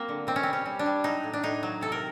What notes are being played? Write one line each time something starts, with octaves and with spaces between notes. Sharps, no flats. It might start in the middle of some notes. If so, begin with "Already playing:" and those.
Already playing: F#3 A#3 C4
D3
B2 C4
C#4
G3 C4
C#4
G3
D4
G3
F#3 D#4
A2
D4
A2 D#4
F#3
C3 A4
A#4